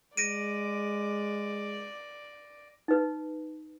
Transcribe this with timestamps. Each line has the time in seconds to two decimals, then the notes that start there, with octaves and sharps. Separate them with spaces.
0.17 G#3 D5 A#6 D7 D#7
2.88 D#4 B4